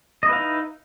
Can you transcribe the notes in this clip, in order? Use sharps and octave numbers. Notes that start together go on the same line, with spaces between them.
D#4 E4 B4 D#5 F5